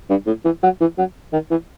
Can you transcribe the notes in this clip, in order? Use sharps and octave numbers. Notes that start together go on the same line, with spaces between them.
G2
A2
E3
F#3
E3
F#3
D#3
E3